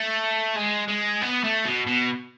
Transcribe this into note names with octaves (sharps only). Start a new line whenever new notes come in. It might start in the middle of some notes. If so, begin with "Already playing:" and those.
Already playing: A3
G#3
G#3
B3
A3
B2
B2